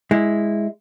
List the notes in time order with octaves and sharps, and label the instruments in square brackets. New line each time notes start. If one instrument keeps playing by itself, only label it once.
[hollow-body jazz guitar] G#3 E4